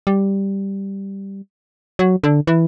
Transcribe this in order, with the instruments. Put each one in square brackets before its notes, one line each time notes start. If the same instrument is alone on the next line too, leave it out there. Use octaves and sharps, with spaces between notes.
[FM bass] G3
F#3
D3
E3